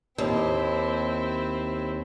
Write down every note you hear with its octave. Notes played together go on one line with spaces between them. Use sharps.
D#2 C4 E4